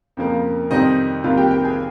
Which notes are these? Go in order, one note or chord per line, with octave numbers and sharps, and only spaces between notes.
F2 C#3 F3 A#3
F2 C3 D#3 G3 C4 D#4 D#5
C2 C3 D#3 A#3 F4 F5
G4 G5
G4 G5
G#4 G#5